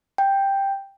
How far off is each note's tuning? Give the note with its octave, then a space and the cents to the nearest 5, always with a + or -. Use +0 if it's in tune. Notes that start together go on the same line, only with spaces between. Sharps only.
G5 +5